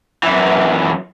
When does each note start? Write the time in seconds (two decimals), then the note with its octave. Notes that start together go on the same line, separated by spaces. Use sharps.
0.23 F#2 E3